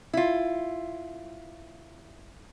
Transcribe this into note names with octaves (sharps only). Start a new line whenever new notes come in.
E4 F4